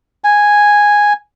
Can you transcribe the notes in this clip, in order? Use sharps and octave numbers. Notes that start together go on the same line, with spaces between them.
G#5